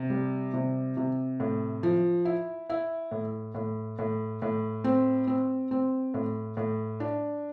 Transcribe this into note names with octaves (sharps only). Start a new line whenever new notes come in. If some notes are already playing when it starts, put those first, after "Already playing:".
Already playing: C3
G3
C3
C3
A2
F3
E4
E4
A2
A2
A2
A2
C4
C4
C4
A2
A2
D4